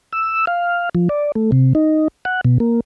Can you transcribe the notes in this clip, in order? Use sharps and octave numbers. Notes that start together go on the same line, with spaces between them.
E6
F5
F3
D5
A3
C3
D#4
F#5
B2
A#3